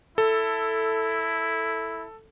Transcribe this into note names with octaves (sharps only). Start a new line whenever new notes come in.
E4 A4